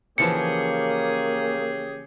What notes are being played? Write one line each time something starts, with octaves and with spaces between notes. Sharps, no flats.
C#3 E3 F3 A#3 C#4 G4 G#4 C#7